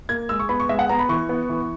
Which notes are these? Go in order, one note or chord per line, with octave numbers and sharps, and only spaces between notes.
A#3 G#6
G#3 E6
C#6
B3 B5
C#6
G#3 E5
F#5
B3 A#5
B5
E3 C#6
B3
E3